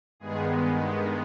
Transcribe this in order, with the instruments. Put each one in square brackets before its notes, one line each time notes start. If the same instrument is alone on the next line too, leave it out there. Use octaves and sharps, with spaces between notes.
[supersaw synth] G2 D#3 G#3 B3 G#4